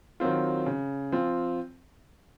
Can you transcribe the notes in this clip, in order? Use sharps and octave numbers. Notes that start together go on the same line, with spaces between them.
D#3 F#3 C4 F4
C#3
F3 C4 F4